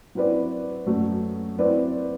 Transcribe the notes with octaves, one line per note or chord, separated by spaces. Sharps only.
F#3 C4 E4 B4 D5
F#2 F#3 A3
F#3 C4 E4 B4 D5